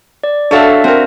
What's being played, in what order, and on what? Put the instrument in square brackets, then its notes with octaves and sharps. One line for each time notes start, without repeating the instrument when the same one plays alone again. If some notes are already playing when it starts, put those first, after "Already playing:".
[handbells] D5
[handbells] D4 E5 [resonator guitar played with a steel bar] F#4 A4 C#5 [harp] D5 F5 A5
[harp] C4 A#4 [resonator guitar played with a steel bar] F#4